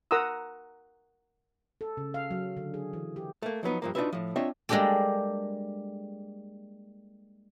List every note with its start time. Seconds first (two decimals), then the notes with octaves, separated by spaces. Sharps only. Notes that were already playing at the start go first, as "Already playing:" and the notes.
0.11 A#4 F#5 A#5 C6 D#6 E6
1.81 A4
1.97 C#3
2.14 F5
2.31 F#3
2.57 D3
2.74 G#4
2.93 E3
3.16 G4
3.42 A3 A#3
3.63 F3 F#3 B3 D#4
3.82 G2 F3 A#3
3.95 D4 D#4 F4 F#4 B4 E5
4.13 A2 F3
4.36 C4 D4 F4 C#5 D#5 E5
4.69 G3 G#3 A#3 D4 G4 A4